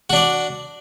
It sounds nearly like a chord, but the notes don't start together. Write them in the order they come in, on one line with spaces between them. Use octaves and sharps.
F#4 D4 D5